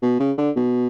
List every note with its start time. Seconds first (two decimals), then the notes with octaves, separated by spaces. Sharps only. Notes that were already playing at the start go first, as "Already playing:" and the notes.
0.02 B2
0.20 C#3
0.38 D3
0.56 B2